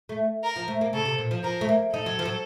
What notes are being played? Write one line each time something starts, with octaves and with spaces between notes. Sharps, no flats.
A3
A#4
F3
A3
A#3
C#3 A4
C3
A#2
F3
F3 A#4
A3
A#3
D#4 A4
F#3
F3
F#3